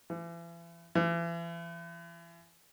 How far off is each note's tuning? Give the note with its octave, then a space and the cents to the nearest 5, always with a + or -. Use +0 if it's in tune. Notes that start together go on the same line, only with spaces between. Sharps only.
E3 +40
E3 +40